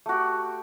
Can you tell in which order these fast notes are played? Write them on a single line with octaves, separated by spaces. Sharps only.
A3 F#4 G4